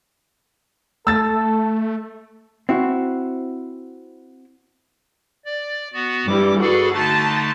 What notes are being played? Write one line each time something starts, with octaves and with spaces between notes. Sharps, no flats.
A3 A4 E6 A6
C4 E4 F#4
D5
B3 F#4
G2 E3 G3 D6
F#4 G#4 A4 B4 D5
D3 A3 D#4 A5